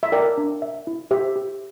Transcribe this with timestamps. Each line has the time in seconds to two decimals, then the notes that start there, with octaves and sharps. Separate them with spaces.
0.03 E5
0.12 A#4 D5 G5
0.38 D4
0.62 E5
0.87 E4
1.11 G4 C5 E5
1.36 G4